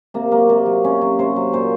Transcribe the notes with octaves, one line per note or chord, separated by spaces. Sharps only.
C3 A#3
F#3 A#3
C3 A#3
F#3
C3 C#4
F#3
C3 C5
F#3
A#2 C5